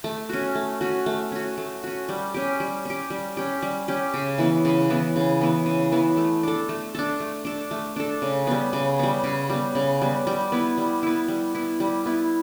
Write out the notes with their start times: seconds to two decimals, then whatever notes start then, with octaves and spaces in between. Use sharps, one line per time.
0.04 A3
0.29 C#4 F#4
0.55 A3
0.81 C#4 F#4
1.06 A3
1.32 C#4 F#4
1.58 A3
1.84 C#4 F#4
2.09 G3
2.34 C#4 G4
2.60 G3
2.85 C#4 G4
3.10 G3
3.37 C#4 G4
3.62 G3
3.88 C#4 G4
4.14 C#3
4.38 E3 B3
4.65 C#3
4.90 E3 B3
5.16 C#3
5.41 E3 B3
5.66 C#3
5.92 E3 B3
6.17 A3
6.43 D4 A4
6.69 A3
6.95 D4 A4
7.20 A3
7.45 D4 A4
7.71 A3
7.96 D4 A4
8.22 C#3
8.47 G3 B3
8.73 C#3
8.99 G3 B3
9.24 C#3
9.50 G3 B3
9.75 C#3
10.02 G3 B3
10.27 G3
10.52 B3 E4
10.78 G3
11.03 B3 E4
11.28 G3
11.55 B3 E4
11.80 G3
12.06 B3 E4